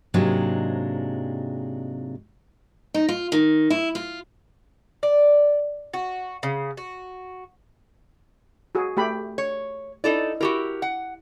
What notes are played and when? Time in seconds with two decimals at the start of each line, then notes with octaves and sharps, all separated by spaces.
0.14 G#2 C3 F#3 G#3 A#3 D4
2.94 D#4
3.09 F4
3.32 D#3
3.70 E4
3.95 F4
5.03 D5
5.94 F#4
6.43 C#3
6.77 F#4
8.75 F#4 G#4
8.97 A3 G4 B5
9.38 C#5
10.04 D#4 E4 A4 D5
10.41 E4 F#4 G4 A#4
10.82 F#5